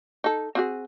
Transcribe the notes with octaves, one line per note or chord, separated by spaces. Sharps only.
D#4 A4
C4 F#4 G#4